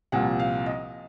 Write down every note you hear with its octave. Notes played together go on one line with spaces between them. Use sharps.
C2 A#2 F3 F#5
F5
D#5